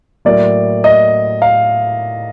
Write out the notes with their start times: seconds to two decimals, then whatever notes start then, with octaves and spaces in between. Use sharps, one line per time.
0.25 A2 F#3 A#3 D5
0.84 D#5
1.42 F5